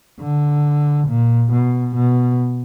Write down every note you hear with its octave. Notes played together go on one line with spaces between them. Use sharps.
D3
A#2
B2
B2